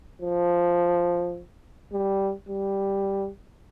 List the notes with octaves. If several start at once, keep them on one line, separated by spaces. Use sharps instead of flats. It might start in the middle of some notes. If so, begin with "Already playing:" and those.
F3
G3
G3